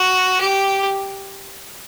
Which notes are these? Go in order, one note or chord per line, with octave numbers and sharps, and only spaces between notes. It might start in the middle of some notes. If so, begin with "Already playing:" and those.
Already playing: F#4
G4